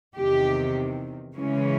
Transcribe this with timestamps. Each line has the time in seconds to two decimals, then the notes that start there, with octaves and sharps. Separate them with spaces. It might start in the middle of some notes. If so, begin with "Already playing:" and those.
0.17 E2 C3 D#3 G4
1.35 C#3 E3 G#3 C#4